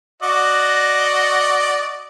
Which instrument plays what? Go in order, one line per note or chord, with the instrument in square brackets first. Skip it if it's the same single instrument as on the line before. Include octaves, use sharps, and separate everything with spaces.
[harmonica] F#4 D5 D#5